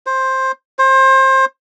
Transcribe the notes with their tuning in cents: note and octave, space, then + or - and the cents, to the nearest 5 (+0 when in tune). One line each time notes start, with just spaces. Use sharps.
C5 +10
C5 +25